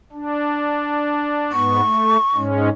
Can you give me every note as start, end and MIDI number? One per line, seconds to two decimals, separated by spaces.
0.13 1.52 62
1.52 1.81 44
1.52 1.81 59
1.52 2.39 85
1.82 2.17 57
2.35 2.69 44
2.35 2.69 56
2.35 2.69 61